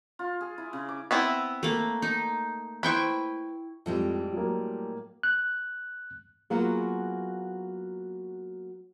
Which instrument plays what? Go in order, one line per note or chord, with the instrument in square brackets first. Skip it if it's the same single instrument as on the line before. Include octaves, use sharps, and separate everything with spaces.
[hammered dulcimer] F4
G#4
E4
C#3
D6
[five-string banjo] B3 C4 E4
[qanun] A3 A#3
D#4
[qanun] E4 G5 C#6 [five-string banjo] B4 C5
[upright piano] F2 [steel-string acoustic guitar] A2 G3 G#3
[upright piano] F#3 A#3
[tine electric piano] F#6
[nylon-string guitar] F#3 A#3 B3 F4 F#4 G#4